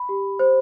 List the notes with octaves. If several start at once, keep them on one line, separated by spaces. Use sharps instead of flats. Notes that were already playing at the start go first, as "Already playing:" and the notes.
Already playing: B5
G4
C5